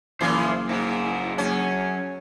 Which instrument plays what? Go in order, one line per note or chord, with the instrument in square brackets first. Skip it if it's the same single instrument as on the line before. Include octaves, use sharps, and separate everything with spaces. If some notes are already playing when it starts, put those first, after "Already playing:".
[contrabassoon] F#1 [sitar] A2 E3 [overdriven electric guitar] C5 F5
[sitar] G#2 [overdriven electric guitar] A#3 E4
[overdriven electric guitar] F#2 [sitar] C#4